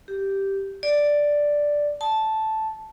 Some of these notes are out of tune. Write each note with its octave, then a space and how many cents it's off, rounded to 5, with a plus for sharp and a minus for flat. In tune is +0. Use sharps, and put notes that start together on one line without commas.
G4 -5
D5 +0
A5 -5